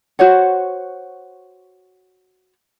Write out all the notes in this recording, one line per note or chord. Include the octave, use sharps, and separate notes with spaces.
F#4 C5 C#5 F#5